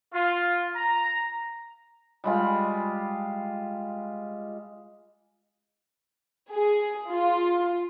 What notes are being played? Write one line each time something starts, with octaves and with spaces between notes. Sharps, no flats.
F4
A#5
G3 G#3 F4
G#4
F4